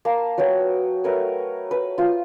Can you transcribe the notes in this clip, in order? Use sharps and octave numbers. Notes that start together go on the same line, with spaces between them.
A#3 A5 C6
F#3 B3 F#4 G5
A3 A#4 B4 C#5
B4
F4 C5